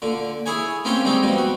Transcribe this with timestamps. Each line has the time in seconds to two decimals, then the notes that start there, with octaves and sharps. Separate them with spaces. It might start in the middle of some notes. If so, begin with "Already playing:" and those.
0.02 A#2 D3
0.46 E4 G#4 C#5 G#5
0.85 A#3 C4 C#4 F4 G4 C#5
1.05 G3 G#3 C4 D#4 G4
1.23 B2 F3 G3
1.38 F#4